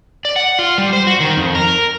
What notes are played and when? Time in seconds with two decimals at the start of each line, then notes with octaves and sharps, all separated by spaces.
0.25 D5
0.36 F#5
0.59 F4
0.78 G3
0.93 C5
1.07 F#4
1.20 D#3
1.36 F2
1.55 A#4